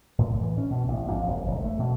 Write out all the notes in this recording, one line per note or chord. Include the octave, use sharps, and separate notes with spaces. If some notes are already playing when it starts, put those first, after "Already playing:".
A2
E3
C#4
B2
A1
F2
F#1
E1
A3
B2